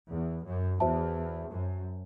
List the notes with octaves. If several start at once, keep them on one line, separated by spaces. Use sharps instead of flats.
E2
F#2
E2 F#4 C5 E5 A5
F#2